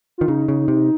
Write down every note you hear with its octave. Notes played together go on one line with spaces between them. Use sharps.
D#3 F4
C#3 D#4
C#3
C3